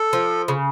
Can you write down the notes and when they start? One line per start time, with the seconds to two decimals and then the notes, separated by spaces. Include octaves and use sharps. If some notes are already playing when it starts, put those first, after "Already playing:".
Already playing: A4
0.13 F3
0.48 C#3